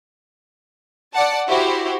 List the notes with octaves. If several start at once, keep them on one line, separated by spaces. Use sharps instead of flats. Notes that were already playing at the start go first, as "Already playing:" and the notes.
D5 F#5 A5
E4 F#4 G4 C5